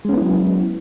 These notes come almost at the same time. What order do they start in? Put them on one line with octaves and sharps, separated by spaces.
G#3 C#4 B3 E4 F#3